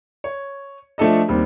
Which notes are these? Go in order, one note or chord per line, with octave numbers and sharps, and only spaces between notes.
C#5
F3 A3 D4 A4 D#5
D#2 G3 C4